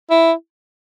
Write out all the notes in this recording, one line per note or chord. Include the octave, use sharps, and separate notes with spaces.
E4